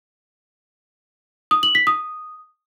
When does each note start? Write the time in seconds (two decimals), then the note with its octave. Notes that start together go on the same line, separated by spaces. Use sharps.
1.51 D#6
1.63 F#7
1.75 B6
1.87 D#6